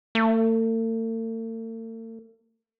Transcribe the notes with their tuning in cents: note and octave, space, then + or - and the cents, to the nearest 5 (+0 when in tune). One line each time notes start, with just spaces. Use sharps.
A3 +45